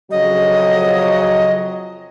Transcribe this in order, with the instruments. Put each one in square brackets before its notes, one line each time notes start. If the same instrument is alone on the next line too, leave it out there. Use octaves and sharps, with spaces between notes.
[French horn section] F2 C#3 F#3 [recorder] D#5